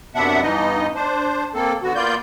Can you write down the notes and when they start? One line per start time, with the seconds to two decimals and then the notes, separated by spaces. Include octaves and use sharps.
0.15 F#2 C3 B3 D4 E5 F#5
0.42 G2 E3 B3 D#4 D#5
0.95 D4 C5
1.55 A#3 C4 A4
1.83 D3 B3 F#4
1.96 A#3 B3 F4 D5 G6